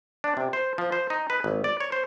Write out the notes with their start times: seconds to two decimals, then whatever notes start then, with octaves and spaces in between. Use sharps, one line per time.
0.24 D4
0.37 C3
0.53 C5
0.78 F3
0.92 C5
1.10 D#4
1.30 B4
1.44 G#1
1.64 D5
1.80 C#5
1.92 C5